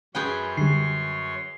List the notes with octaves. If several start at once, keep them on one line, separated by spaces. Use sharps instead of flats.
F#2 G#4 B4 C#5 G5 C6
D3 G3 C7